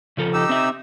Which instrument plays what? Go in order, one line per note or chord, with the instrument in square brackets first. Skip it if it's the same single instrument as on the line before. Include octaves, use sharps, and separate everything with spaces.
[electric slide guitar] C#3 F3 A4
[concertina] D#4 G4 E6
[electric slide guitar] C4 E5